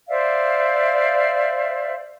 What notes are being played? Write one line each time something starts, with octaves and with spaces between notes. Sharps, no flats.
C5 D5 E5 F5